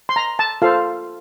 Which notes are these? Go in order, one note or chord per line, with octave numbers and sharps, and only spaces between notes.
C6
A#5
A5
F4 A4 C5 F5